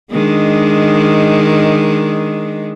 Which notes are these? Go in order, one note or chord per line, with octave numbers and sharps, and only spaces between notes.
D#3 G#3 D4